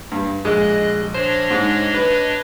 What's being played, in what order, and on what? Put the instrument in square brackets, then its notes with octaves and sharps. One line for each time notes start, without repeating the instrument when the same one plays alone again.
[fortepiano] G2
[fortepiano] A#1 [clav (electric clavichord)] G#3 [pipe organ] D#5 F#6
[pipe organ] D4 C#5 D#5 [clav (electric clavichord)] C5
[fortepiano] G#2
B4